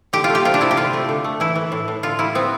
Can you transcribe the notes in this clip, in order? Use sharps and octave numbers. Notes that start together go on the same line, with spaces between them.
D3 G4
F4
A3
G4
C3 F4
D4
C3 E4
G4
D3 F4
A3
D3
A3
E3 E4
E3
A2
A2
D3 F4
G3 E4
B3 C4